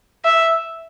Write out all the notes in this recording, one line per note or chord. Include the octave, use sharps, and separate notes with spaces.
E5